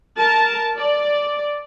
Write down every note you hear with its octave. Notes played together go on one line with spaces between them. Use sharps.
A#4 A5
D5